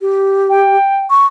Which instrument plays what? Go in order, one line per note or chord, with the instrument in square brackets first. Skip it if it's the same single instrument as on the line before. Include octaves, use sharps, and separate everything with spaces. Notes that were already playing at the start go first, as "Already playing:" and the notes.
[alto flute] G4
[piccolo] G5
[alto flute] C#6